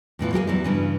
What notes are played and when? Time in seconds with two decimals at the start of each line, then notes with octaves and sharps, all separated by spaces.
0.19 E2 A2 E3 F4
0.33 F#3 A#3 G4 G#4
0.47 E2 F#3 G3 E4
0.64 G2 C#3 E3